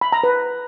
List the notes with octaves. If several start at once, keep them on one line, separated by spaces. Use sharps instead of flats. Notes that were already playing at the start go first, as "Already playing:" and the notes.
B5
A#5
B4